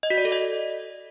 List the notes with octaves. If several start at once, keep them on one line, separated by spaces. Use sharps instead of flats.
D#5
F#4
D5
A4
D#5